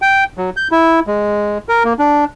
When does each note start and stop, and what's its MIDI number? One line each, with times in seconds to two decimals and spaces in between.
0.02 0.24 79
0.37 0.50 54
0.57 0.68 91
0.71 1.00 64
1.07 1.58 56
1.69 1.83 70
1.84 1.93 58
1.99 2.25 62